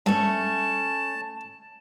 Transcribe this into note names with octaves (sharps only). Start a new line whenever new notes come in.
G2 A3 C#4 A5